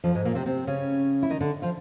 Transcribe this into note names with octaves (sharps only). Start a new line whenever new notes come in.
F2 F3
G#2 G#3
A#2 A#3
C3 C4
C3 C4
C#3 C#4
E4
D#3 D#4
D3 D4
F3 F4